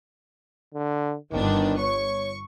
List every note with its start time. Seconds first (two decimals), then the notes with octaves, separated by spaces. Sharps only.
0.74 D3
1.32 G1 D#3 B3 D4
1.79 C#5 C#6